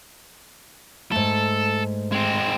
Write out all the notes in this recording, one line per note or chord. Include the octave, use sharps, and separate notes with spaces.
G#2 A3 A4
G#3 C4